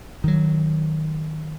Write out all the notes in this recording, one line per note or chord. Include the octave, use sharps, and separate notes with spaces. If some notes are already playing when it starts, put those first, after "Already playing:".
D#3 F#3